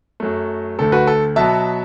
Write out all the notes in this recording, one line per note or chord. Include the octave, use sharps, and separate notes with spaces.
F#2 F#3 A3
D2 D3 A3 A4
F#4 B4
A4
B2 F#3 B3 E5 A5